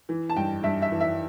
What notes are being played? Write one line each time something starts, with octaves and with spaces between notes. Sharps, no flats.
E3
A5
G2 G5
G2 E5
E5
E3
E5